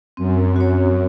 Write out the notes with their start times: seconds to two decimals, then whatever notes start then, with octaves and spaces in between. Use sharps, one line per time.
0.17 F#2 C4
0.56 F#4 C#5